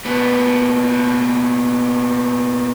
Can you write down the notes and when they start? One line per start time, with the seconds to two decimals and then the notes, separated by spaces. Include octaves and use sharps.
0.05 A#2 B3